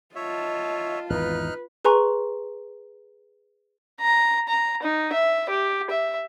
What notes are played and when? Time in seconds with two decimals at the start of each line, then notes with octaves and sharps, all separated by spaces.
0.16 F4 C#5 D#5 E5 A5
1.10 G#1 E2 E3 D#4 B4 F6 F#6
1.85 G#4 B4 G#5 A#5 C6 C#6
4.01 A#5
4.48 A#5
4.83 D#4
5.13 E5
5.50 G4
5.90 E5